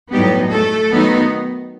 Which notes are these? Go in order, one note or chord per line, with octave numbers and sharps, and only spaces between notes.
A2 F#3 G3 B3 D#4 G4
A3 A4
D#3 F#3 B3 D#4